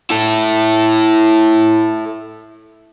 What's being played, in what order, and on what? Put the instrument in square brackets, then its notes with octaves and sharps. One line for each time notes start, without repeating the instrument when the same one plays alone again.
[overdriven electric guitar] E4 A4